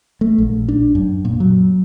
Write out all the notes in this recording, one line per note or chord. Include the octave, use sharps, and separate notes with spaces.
A3
A#1
D4
F#2
A#2
F#3